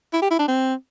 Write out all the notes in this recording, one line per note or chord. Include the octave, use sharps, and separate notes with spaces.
E4
G4
E4
D4
C4